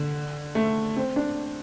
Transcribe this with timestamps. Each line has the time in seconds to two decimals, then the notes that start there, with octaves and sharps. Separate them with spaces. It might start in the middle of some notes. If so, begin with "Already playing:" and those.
Already playing: D3
0.55 A3
0.96 C4
1.16 D4